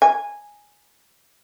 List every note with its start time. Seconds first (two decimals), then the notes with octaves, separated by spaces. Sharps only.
0.02 G#5